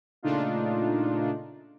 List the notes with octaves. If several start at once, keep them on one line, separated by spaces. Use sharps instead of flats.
A#2 C#3 A3 D4 D#4 F4